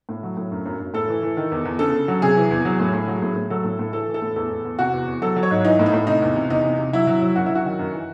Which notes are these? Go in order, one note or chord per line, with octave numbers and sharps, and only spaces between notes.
A2
F#3
A2
F#2
F#2
F#2
A2 A4
E3
E3
D#3
E2
E2
C#3 A4
C#3
F#3
C3 G#4
E3
E2
F#3
A2
A2
F#3
A2
A2
F#3 A4
A2
A2
E3 A4
E3
A4
A2
E2 A4
E2
E2
C3 F#4
E2
E2
F#3 A4
F#3
C#5
G#2
E3 D#4
A2
D#4
A2
C3 D#4
E2
C3
E2 D#4
C3
C3
F#3 E4
F#3
F#3
F#2 F#4
F#3 E4
F#4
D#3
F#2
E3